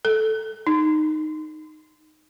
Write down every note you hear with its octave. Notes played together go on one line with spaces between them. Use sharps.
A4
D#4